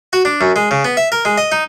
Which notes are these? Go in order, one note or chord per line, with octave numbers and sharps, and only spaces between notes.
F#4
D4
F#2
G#3
C#3
B3
E5
A#4
G#3
D#5
D#4